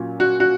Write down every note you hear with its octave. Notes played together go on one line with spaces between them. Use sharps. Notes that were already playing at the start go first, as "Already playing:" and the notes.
Already playing: A#2 F#3 C#4
F#4
F#4